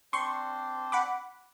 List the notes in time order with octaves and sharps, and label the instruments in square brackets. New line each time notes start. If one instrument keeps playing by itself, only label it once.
[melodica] C4 D4 C5 [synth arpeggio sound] C6 C#6
[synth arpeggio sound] F#5 B5 D6